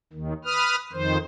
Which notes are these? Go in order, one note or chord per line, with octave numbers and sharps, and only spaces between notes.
D#2 D#3
B4 D#6 F6
F2 D#3 C5